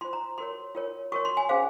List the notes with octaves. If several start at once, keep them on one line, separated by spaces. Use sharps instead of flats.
F4 C5 C6
A#5
F#4 A#4 C#5 C6
F4 A#4 C#5
F#4 A#4 C#5 C#6
C6
G#5
C#4 G#4 C5 F5